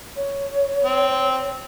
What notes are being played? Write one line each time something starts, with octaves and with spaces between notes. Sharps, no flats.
C#5
C4